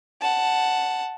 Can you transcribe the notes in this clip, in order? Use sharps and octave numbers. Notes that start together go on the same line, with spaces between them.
F#5 A5